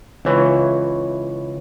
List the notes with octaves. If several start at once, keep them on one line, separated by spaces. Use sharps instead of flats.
C#2 E3 E4 C#5